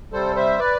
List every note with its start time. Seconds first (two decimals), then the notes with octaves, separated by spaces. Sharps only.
0.12 C3 G3 A4 C5
0.36 C5 E5
0.59 B4 D5